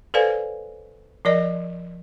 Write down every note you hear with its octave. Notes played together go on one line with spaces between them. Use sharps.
A4 B4 C5 D5 F5 G#5
F3 A#4 D5 D#5